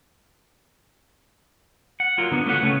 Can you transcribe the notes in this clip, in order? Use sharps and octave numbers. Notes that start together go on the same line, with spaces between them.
F#5
F#3 F4 A#4
D3 B3 D4
F#3 A3 F4 B4 D#5 F#5
C#3 A3 B3 C#4